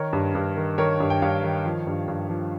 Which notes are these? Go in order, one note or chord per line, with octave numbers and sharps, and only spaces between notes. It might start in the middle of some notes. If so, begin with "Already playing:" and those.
Already playing: D#3 A#4 C#5
G2
G2
D#3
D#3 A#4 C#5
G2
G5
G2 C#5 F5
D#3
F3
G2
G2
F3